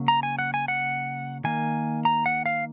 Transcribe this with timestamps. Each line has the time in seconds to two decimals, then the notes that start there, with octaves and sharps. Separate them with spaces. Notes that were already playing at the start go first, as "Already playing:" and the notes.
Already playing: C#3 F#3 A#3
0.08 A#5
0.23 G#5
0.39 F#5
0.54 G#5
0.68 F#5
1.44 D#3 A#3 G#5
2.05 A#5
2.26 F#5
2.46 F5